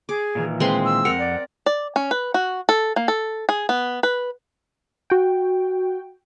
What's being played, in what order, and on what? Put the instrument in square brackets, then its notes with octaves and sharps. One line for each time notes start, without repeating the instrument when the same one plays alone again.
[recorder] G#4 [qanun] D6
[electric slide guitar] A#2 D#3 E3
[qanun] G#3 C4 C6 [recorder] B4
[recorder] E6
[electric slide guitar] F2 D#3 F#5 [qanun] A#4
[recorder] D5
[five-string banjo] D5
C#4
B4
F#4
A4
A#3
A4
G#4
B3
B4
[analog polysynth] F#4 G5